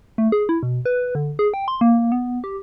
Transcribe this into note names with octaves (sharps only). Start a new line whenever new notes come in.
A3
G#4
E4
B2
B4
D3
G#4
G5
C6
A#3
B3
G4